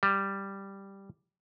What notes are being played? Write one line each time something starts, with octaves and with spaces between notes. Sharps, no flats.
G3